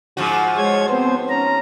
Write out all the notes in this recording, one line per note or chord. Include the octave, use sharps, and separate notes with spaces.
G#2 F3 F#4
G#3 C#5 G#6
B3 C4 C5
C#4 A#5